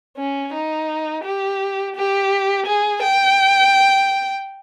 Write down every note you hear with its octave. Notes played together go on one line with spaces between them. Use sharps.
C#4
D#4
G4
G4
G#4
G5